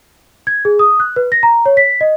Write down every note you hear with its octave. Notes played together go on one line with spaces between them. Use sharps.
G#6
G#4
D#6
F#6
B4
A#6
A#5
C#5
B6
D#5